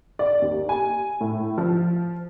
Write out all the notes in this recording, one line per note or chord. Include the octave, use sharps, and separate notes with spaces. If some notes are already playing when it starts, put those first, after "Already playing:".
D5
D#2
G#5
A2
F3